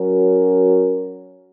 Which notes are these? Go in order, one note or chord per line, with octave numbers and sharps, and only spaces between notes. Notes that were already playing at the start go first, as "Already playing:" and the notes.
Already playing: F#3 C#4 F#4 A#4